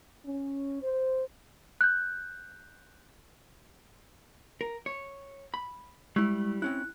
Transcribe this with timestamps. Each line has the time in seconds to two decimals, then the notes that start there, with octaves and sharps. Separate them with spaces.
0.25 C#4
0.82 C5
1.81 F#6 G6
4.61 A#4
4.86 C#5
5.54 B5
6.16 G3 G#3 E4
6.62 C4 C#4 E4 F#6